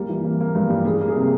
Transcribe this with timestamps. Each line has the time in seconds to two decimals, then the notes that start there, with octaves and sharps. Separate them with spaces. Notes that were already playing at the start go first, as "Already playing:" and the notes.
Already playing: G3 A#3
0.09 E3
0.25 A#3
0.40 A#3
0.55 G2
0.70 G3
0.85 G3 G#4
1.01 A#3
1.08 G#4
1.16 C3